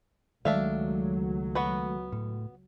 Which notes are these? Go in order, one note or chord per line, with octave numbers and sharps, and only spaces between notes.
C#2 D#3 F#3 G#3 A3 D4 E5 F5
B3 F#4 B4
A2